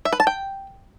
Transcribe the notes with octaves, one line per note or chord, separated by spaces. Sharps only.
E5
B4
A5
G5